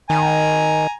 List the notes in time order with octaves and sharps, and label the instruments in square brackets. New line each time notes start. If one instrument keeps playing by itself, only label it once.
[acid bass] D#3 [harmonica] G#5 A#5